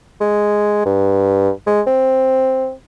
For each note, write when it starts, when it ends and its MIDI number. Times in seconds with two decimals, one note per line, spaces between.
0.21 0.83 56
0.86 1.51 43
1.67 1.82 56
1.87 2.72 60